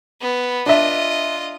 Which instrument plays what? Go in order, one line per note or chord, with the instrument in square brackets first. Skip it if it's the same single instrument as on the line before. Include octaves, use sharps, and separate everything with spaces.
[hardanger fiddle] B3
[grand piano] D4 E5 [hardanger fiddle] F4 D#5